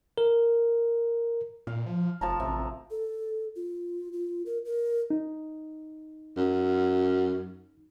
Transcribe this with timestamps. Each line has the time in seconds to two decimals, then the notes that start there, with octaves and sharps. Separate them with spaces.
0.18 A#4
1.67 A#2 F5
1.86 F3
2.21 F1 F3 A5 A#5
2.40 A1 C3
2.91 A4
3.56 F4
4.13 F4
4.46 A#4
4.65 A#4
5.10 D#4
6.37 F#2